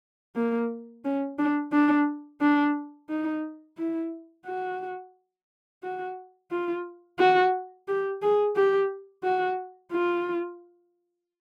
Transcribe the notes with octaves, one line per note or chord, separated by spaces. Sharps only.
A#3
C#4
D4
D4
D4
D#4
E4
F#4
F#4
F4
F#4
G4
G#4
G4
F#4
F4